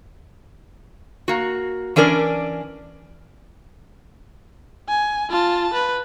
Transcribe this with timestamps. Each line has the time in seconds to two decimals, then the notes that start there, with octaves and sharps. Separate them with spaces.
1.28 A#3 F#4
1.96 E3 C#4 D4 A#4 B4 D5
4.89 G#5
5.30 F4 A5
5.74 B4